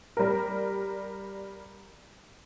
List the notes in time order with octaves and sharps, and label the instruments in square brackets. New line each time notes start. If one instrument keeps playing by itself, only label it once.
[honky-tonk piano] G3 A#4